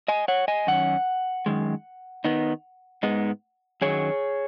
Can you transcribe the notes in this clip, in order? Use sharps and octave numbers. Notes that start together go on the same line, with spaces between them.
D#5 G#5
C#5 F#5
D#5 G#5
F#2 D#3 C#4 F#5
F#2 D#3 G#3
D#3 B3 D#4
G#2 G#3 B3 D#4
F#2 D#3 F#3 G#4 C#5